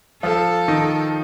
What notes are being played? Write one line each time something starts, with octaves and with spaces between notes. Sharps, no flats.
F3 F4 A4
D#3 D#4